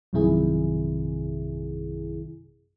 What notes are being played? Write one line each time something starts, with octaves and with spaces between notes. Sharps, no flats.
A#1 F#2 C3 D#3 E4 G#4